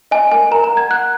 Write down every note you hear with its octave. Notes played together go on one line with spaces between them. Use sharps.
D#5 G#5
A#4 G#5
A#4 A#5
A#5
F#5
G#6
F#5 F#6